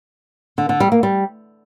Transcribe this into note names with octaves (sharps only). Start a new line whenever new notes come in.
D3
D3
G3
A#3
G3